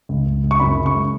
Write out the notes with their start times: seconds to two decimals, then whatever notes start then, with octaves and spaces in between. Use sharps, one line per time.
0.09 C#2
0.26 C#2
0.44 C#2
0.51 C#6
0.60 F#2 B5
0.77 C#3
0.86 C#6
0.94 G#3